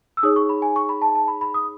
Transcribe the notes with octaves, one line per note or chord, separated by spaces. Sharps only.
E6
D#4 G#4 C#5 D#6
C#6
B5
G#5
C#6
B5
A5
A5
B5
B5
D#6